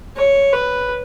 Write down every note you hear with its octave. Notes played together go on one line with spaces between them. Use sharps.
C#5
B4